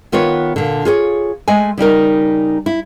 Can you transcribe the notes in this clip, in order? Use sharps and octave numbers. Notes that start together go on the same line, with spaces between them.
D#3 B3 F4 B4 C#5
A#2 D3
F4 G#4 C5 C#5
G#3 A3 G#5
C#3 G3 D#4 A#4
E4